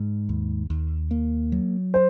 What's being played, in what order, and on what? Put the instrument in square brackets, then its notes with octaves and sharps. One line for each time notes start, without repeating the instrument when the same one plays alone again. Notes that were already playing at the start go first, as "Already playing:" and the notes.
Already playing: [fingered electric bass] G#2
D#2
D#2
A#3
F#3
[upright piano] C5